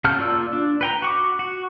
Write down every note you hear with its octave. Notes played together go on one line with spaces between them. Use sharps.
C#3 F#4 A5 F6 G6
A#3 F4 D5 E6
D4
B4 G5 A#5
F#4 C#6 D6
F#4